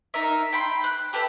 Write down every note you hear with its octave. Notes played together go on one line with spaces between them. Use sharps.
D#4 A#4 E5
G5 B5 C6
F#6
G4 A4 B4 E5